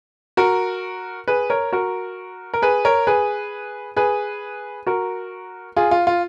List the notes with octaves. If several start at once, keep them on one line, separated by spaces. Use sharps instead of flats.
F#4 A#4
G#4 B4
A#4 C#5
F#4 A#4
A#4
G#4 B4
A#4 C#5
G#4 B4
G#4 B4
F#4 A#4
F4 G#4
F4
F4